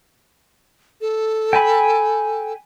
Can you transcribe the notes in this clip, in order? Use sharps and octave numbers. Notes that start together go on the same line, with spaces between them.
A4
G5 G#5 B5